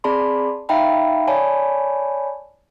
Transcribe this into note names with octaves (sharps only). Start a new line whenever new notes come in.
C4 G#4 D5 A5 B5 C6
D#4 E5 F5 G5 A#5 B5
C#5 D5 G#5 A5 B5